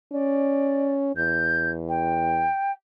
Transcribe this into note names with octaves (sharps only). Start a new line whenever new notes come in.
C#4 D5
E2 G6
G5